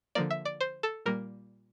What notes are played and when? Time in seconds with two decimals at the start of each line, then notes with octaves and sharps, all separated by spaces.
0.15 D3 F3 A#3 D5
0.31 E5
0.45 D5
0.61 C5
0.83 A4
1.06 A#2 G3 A#3 A#4